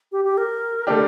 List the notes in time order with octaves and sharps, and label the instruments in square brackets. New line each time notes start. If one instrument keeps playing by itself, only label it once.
[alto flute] G4
G4
A#4
[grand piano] D3 A3 D4 G4